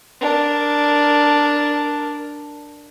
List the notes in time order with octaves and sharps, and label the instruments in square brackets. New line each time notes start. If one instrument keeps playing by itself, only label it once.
[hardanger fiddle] D4 A#4